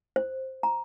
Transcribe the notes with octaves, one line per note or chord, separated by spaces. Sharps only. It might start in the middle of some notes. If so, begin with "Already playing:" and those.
C5
A#5